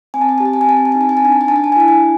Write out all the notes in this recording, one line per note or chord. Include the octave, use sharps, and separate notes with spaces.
C4 G#5
A5
G#5
G4 A5
G#5
A5
G#5
C4 A5
G#5
A5
D#4 G#5
A5
G#5
A5
D4 G#5
A5
G#5
D4 A5
G#5
A5
G#5
E4 A5
G#5